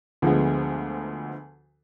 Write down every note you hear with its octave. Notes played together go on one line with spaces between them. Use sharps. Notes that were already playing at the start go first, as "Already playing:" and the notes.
D2 D3 F3 G#3 B3